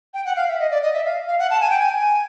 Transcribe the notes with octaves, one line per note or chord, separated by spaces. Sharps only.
G5
F#5
F5
E5
D#5
D5
D#5
E5
F5
F5
F#5
A5
G#5
G5
G#5